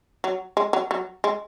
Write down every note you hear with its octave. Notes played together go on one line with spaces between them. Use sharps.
F#3
G#3
F#3
F#3
G#3